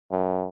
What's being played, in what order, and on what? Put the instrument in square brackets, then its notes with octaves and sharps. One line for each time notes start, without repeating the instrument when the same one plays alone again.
[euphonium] F#2